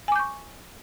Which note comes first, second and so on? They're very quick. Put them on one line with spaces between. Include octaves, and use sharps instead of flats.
G#5 D6 G6 C#6